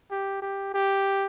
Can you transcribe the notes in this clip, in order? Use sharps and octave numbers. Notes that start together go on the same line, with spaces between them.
G4
G4
G4